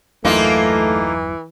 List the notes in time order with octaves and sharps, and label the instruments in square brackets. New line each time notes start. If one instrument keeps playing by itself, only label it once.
[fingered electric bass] G1 E2 F#3 [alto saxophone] E3 [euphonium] A3 [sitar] A#3 D#4 F4